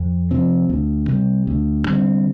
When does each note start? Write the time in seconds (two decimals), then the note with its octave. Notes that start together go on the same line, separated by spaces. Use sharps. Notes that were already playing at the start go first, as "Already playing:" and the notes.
Already playing: F2
0.31 C3 F3 C4
0.69 D2
1.08 C3 G3
1.47 D2
1.86 D3 G3 C4